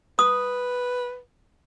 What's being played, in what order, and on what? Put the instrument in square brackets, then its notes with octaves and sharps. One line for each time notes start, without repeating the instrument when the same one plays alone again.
[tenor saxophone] B4 [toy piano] D#6